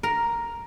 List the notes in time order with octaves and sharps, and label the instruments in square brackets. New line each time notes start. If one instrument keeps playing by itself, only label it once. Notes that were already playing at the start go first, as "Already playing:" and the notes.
[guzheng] A#4